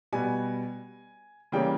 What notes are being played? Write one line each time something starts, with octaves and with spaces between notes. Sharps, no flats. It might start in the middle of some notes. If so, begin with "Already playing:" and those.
B2 G3 B3 G#5
C#3 E3 G3 A#3 C#4 G5